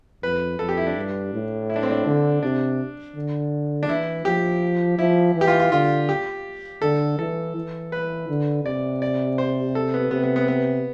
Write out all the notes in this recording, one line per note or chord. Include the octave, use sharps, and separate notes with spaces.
F2 B4
F2 A4
G4
E4
D4
G2
A2
E4
D4
C4
D4
D3
C3 D4
D3
D4
E3 E4
F3 G4
F3 E4
E3
G4
F4
F4
D3 F4
G4
D3 A4
E3 A4
E3
B4
D3
C3 D5
D5
C5
A4
B3
C3 B3
B3
B3
B3